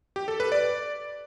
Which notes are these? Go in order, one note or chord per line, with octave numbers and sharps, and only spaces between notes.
G4
A4
B4
D5